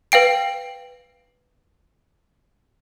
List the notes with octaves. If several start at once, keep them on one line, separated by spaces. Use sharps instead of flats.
B4 F5 G5 D7